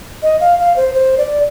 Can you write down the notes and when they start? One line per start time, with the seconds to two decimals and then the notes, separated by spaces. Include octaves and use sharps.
0.23 D#5
0.40 F5
0.59 F5
0.76 C5
0.94 C5
1.18 D5